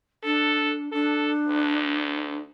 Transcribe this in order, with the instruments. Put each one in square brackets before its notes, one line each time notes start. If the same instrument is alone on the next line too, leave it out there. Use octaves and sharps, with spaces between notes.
[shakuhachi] D4 [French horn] A4
[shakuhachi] D4 [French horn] A4
[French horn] D2